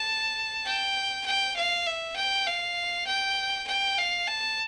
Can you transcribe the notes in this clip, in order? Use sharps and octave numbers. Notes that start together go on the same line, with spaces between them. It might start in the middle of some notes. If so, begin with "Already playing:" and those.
Already playing: A5
G5
G5
F5
E5
G5
F5
G5
G5
F5
A5